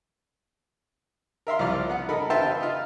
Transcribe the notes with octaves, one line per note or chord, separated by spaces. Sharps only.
A#4 E5 F5 C6
C2 F3 D5 F6
B3 F#5
D#4 A4 A#4 B5
B4 C5 E5 F5 G5 A5
D#4 F4